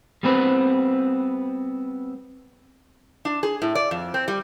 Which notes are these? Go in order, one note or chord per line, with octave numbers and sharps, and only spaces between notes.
G3 B3 C4 B4
D4
G#4
A2
D5
F2
C4
G3